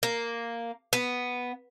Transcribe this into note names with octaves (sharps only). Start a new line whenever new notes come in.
A#3
B3